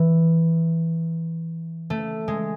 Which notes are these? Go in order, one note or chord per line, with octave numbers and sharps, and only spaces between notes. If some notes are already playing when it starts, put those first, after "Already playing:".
Already playing: E3
A3
G#3